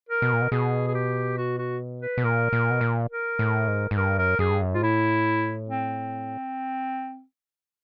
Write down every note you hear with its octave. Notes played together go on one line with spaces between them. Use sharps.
A#4
B2
A#2
B2
B2 G#4
G#4
G4
F#4
F#4
B4
B2
A#2 A#4
A#2
B2
A#2
A#4
A2
G#2
G#2
G2 A#4
F#2 A#4
F#2 G#4
G2
F#2
G#2 F4
A2 E4
C4